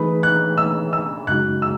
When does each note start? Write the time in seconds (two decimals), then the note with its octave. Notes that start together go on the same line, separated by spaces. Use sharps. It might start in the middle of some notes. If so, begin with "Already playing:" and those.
Already playing: E3 A3 D#4 G#4 B4 B5
0.23 F#6
0.58 E6
0.93 E6
1.27 F#2 C#3 G#3 D#4 F#4 F#6
1.62 E6